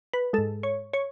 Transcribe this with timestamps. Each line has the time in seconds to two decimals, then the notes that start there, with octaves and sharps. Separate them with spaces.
0.13 B4
0.33 G#2 G#3 A4
0.63 C#5
0.94 C#5